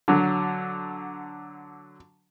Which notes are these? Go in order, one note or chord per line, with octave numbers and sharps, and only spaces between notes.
D3 F#3